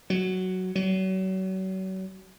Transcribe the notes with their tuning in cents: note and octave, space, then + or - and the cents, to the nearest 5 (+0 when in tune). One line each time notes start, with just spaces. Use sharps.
F#3 +5
F#3 +35